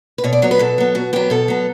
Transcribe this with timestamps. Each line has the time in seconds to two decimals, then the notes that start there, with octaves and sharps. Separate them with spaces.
0.18 B4
0.24 B2 C#5
0.33 D5
0.42 F#3 B3 C#5
0.51 B4
0.59 B2 A4
0.78 F#3 B3
0.95 B2 F#4
1.13 F#3 B3 G4
1.30 B2 A4
1.48 F#3 B3